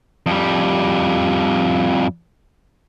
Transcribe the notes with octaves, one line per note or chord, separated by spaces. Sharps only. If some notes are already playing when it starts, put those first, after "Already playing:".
F2 G3